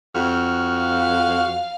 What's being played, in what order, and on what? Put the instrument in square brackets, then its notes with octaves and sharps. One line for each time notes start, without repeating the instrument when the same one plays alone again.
[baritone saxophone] F2 [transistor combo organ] F#4 F6
[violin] F5